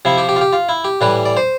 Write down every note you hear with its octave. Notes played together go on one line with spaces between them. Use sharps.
C3 F3 E4
G4
G4
F4
G4
F4
E4
G4
A2 E3 G3 B4
D5
C5